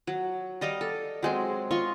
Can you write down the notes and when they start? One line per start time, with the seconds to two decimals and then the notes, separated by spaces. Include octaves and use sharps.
0.07 F#3
0.61 G3 D#5 F5 D6
0.81 A4
1.23 F#3 G#3 C4
1.71 F4 D#5 C6 C#6